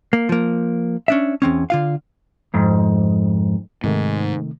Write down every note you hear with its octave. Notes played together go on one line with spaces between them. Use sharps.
A#3
F3 A#3
C#4 D4 E5
E2 C4 C#4
D3 F4 F5
F2 G#2
G#2 C3 D#3 A3